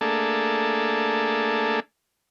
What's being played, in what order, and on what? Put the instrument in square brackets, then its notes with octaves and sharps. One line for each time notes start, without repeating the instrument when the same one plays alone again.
[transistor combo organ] A3 A#3 D4 G#4 A4